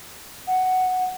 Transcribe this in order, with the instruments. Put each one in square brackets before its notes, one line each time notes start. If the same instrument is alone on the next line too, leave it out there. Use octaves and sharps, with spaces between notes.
[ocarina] F#5